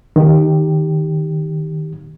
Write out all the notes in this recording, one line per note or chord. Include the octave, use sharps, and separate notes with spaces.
D#3 G4